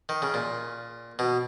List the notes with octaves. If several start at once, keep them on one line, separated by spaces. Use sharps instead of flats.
D#3
C#3
A#2
B2